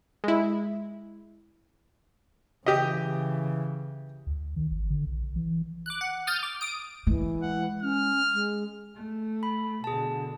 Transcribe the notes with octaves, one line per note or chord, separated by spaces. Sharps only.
G#3 E4
C#3 E3 G4 D#5
D2
D#3
G#1
D3
A#1
E3
D6 F#6
F#5
D#6 F6 G6 A6
D6
D#6 D7
E3 G#3
F#5
C#4 F6
G#3
A3
B5
B2 D3 G#4 A5